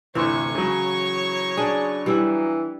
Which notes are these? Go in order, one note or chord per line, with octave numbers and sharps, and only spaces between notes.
G1 D2 C3 E3 C#5 C#6
C#3 F#3
D4 G#4 D5
E3 G3 E4